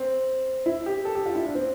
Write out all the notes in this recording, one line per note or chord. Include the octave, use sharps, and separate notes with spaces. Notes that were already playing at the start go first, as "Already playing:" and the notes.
Already playing: C4
E4
G4
A4
G4
F4
E4
D4
C4